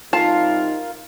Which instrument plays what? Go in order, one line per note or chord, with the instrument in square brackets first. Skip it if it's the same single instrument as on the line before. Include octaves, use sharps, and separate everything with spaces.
[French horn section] C3 G3 D#4 [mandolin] F4 A#4 [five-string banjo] A5